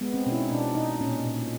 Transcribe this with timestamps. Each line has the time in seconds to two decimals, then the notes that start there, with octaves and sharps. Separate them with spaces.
0.01 G#3 B3
0.14 C4
0.26 B2 C#4
0.32 E4
0.38 D#4
0.50 B2 D4
0.75 B2 D#4
1.00 A#2 C#4
1.25 A#2